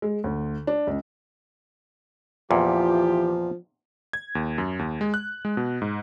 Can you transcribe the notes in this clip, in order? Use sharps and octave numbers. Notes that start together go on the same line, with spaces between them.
G#3
D2
D4
C#2
E2 A#2 E3 F3 F4 G4
G#6
D#2
F#2
D#2
G#3
F#6
G#3
B2
G#2